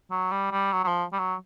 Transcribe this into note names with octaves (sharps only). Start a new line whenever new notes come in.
F#3
G3
G3
F#3
F#3
F3
G3
F#3